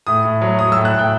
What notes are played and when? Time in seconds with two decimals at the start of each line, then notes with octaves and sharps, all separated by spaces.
0.07 A2 D#6
0.24 A2
0.41 F#3
0.59 F#3 D#6
0.72 E6
0.76 A2
0.85 F#6
0.94 A2 G5